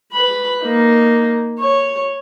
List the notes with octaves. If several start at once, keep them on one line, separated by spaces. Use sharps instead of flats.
B4 B5
A#3 D#4
C#5